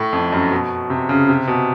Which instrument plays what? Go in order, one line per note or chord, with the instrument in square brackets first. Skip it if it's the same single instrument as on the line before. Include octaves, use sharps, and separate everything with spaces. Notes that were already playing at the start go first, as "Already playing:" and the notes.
Already playing: [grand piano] A2
F2
F#2
B2
C3
C#3
C3
B2